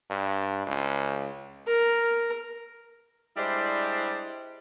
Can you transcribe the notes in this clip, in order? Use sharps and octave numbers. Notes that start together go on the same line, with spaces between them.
G2
C#2
A#4
G3 G#3 D4 E4 C5